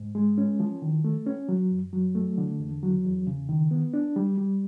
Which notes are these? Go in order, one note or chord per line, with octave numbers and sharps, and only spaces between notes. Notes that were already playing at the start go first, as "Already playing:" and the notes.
Already playing: G#2
G#3
C#4
F3
D#3
A3
C#4
F#3
F#2
F#3
A3
D3
E2
F#3
E2
C#3
D#3
B3
D4
G3
G3